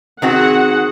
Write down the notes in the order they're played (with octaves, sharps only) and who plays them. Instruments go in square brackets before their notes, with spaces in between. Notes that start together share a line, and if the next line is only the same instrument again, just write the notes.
[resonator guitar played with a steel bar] D#3 C4 F#4 [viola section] G#4 F#5